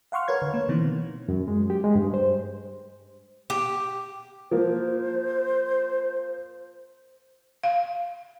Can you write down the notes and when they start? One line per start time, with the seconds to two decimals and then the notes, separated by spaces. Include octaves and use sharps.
0.12 F5 F#5 C6 C#6 F6
0.28 A#4 B4 C#5 G#6
0.42 D3
0.54 A#3
0.68 B2 D#3 E3 B3 C4
1.29 F#2
1.48 G#3
1.70 G4
1.84 G#3
1.95 G2
2.14 C5
3.50 G4
4.51 F3 A#3 C5
7.63 F5